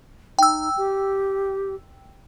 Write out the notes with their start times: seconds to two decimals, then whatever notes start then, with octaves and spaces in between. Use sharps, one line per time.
0.39 D#4 G5 E6
0.77 G4